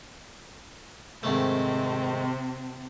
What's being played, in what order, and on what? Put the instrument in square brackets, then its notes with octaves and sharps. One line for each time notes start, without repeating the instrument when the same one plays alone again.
[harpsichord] G#2 D#3 A3 [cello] C3 C4